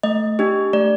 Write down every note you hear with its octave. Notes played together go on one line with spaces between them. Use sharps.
A3 D#5
D4 G4
A3 D5